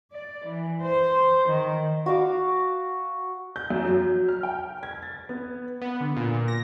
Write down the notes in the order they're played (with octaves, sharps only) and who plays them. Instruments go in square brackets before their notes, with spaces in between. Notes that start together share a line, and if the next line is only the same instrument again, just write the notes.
[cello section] D5
E3
C5
D#3
[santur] F#4 F5 C#6 D6
[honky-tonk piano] G6
F#2
F#3
F6
G5
G#6
A6
B3
[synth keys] B3
D3
A#2
A#2
A#6